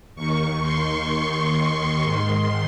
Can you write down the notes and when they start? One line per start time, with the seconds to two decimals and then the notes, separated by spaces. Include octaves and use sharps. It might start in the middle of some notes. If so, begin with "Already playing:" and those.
0.15 D#2 D#3 C#6
0.62 C6
2.03 G#2 D#3